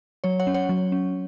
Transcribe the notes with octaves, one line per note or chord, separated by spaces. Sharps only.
F#3 C#5
C#5 F#5
C#4
C#5 F#5
F#3
C#4